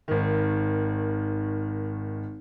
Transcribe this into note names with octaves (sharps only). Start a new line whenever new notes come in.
G#1 D#3